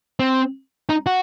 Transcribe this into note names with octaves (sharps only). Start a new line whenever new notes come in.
C4
D#4
F#4